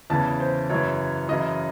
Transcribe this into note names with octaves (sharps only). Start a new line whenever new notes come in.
E2 C#3 E3 A5
C5
F#2 C#3 E3 C#5
F#2 C#3 E3 D#5